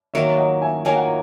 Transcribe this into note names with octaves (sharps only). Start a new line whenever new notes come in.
D#3 F#3 A#3 C#5 E5
D#5 F#5
E5 G#5
D#3 F#3 A#3 G#5
F#5